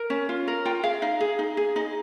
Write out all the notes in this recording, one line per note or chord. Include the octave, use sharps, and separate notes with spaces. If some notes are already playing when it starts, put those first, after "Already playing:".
Already playing: A#4
C#4
F4
A#4
F4 G5
G#4 F5
D#4 F5
G#4
D#4
G#4
D#4 D#5